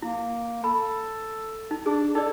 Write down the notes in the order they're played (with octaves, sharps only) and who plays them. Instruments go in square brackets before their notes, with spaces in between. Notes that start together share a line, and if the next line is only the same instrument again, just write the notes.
[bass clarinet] A#3 [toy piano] E4
[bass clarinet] A4 [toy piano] B5
[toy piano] D#4
[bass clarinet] D4 [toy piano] G#4
[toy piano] D#4 D5 [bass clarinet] A4